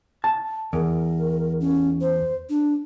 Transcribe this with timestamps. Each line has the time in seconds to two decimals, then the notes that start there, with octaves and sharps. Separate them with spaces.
0.24 A5
0.73 E2 A#4
1.61 C#4
2.01 C5
2.49 D4